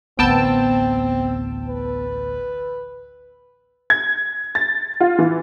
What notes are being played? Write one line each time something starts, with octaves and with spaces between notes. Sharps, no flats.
A1 D2 B3 C4 G5 A5 E6
B4
G#6
A6
F4
E3